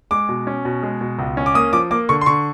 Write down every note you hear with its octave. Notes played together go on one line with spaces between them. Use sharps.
G#3 D6
B2
C#4
B2
G#3
B2
C#2
C#4
D6
A#3 D#6
F3 D6
A#3 D6
D3 C#6
C6
D3 C#6